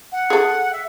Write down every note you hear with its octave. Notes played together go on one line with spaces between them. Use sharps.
F#5
G#4 A4
E5